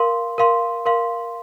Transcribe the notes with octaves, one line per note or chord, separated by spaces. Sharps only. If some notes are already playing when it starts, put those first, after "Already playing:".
Already playing: A#4 F5 C6
A#4 F5 C6
A#4 F5 C6